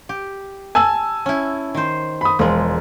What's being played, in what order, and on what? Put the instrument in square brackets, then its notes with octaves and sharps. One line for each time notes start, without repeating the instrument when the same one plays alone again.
[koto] G4
[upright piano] G#5 A5 E6
[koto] C#4 E4
D#3 C5
[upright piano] B5 D#6
[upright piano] E1 [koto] F3 G#3